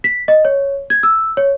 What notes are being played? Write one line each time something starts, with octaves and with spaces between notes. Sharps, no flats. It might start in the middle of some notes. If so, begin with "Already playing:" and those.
B6
D#5
C#5
G#6
E6
C#5